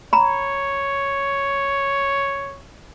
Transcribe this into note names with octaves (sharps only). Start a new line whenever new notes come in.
C#5 A#5 B5